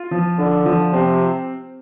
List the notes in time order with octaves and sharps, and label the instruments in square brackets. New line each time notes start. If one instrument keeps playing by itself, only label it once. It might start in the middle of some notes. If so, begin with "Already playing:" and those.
Already playing: [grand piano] F4
F3
[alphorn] D3 [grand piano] D4
[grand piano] F3
[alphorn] C3 [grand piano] C4